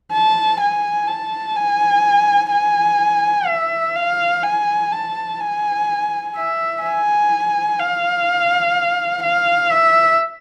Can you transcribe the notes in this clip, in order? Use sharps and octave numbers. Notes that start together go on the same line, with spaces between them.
A5
G#5
A5
G#5
G#5
E5
F5
G#5
A5
G#5
E5
G#5
F5
F5
E5